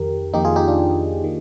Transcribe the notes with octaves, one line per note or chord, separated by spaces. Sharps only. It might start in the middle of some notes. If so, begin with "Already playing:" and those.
Already playing: F2 D#3 G4 A#4
F2 D#3 A#3 D#4 G4
F4 G#4
D#4 G4
D4 F4
D#3 A#3